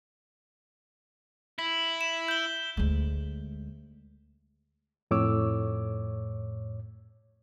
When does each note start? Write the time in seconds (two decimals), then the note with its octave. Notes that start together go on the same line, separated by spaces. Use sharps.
1.59 E4 B6
2.01 E7
2.28 G6 G7
2.77 D2 G#3
5.11 F2 A2 C#5 D6 E6